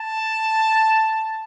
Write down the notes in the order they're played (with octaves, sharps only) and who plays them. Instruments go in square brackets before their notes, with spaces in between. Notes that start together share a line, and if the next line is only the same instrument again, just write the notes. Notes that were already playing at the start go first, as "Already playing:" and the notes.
Already playing: [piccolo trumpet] A5